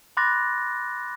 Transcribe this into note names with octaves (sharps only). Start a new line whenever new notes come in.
B5 C6 D6 F#6 A6 A#6